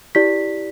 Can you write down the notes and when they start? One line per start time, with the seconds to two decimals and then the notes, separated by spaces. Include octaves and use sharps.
0.15 E4 G4 D5 B6